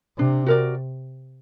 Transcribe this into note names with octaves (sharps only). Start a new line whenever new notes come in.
C3 D4
F#4 A#4 D5